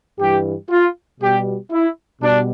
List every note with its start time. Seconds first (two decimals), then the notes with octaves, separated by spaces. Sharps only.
0.20 G2 E3 G3 G4
0.70 F4
1.21 B2 G3 G4
1.71 E4
2.21 B2 G3 D4